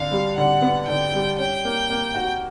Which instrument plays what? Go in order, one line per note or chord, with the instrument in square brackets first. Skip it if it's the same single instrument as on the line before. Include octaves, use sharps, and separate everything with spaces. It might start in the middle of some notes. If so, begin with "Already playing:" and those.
Already playing: [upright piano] D3 [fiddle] F5
[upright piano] G3
[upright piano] D3 [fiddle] F#5
[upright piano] B3
[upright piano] D3 [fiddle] G5
[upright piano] G3
[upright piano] C#4 [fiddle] G5
[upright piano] A#3
A#3
F#4